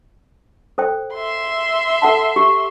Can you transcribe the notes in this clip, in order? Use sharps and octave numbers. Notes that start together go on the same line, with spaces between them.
A4 C5 G5
E5 C6
A4 F#5 A5
G4